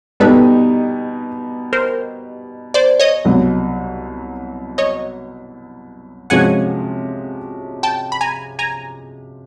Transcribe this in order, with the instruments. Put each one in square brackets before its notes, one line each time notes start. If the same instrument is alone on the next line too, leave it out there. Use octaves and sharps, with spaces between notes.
[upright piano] B2 G3 B3 D#4 G4 [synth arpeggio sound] A4 B4
[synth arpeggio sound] A#4 C5
C5 D5
C#5 D#5
[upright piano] C2 B2 F#3
[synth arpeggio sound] C#5 D#5
[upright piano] C3 F3 G#3 C#4 F#4 [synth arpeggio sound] F#5 G#5
[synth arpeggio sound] G5 A5
B5
G#5 A#5
G#5 A#5